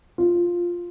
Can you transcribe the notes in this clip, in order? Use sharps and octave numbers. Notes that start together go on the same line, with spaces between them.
F4